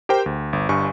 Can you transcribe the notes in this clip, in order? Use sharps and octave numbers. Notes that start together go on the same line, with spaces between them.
G4 A#4 C5 G5
D2
G1
G1 G2 G#5 C#6